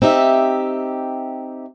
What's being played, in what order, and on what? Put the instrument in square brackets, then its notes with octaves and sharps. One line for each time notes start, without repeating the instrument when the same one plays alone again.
[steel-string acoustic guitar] C4 D#4 G4 E5